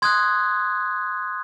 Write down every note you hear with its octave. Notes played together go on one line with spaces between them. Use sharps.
C6 D#6 F#6 G#6